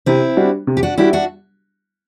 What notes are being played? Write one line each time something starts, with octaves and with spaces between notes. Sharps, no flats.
C3 C4 E4
G3 D4 F#4
C3
G4
D4 F#4
G3 D4 E4 F#4 G4
D4 F#4